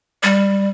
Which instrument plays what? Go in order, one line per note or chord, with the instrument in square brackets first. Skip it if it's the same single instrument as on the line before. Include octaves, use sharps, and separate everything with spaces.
[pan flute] G3